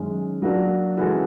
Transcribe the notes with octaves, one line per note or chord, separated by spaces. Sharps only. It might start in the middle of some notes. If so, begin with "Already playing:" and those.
Already playing: F#2 D#3 G#3 C#4
F#3 A#3 D4 F#4
E3 G#3 C#4 F#4 A4